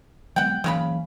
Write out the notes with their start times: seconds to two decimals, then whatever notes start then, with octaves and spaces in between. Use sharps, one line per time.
0.36 F#3 G#3 B3 F#5 G5
0.64 C#3 E3 F#3 A#3 F#4 B5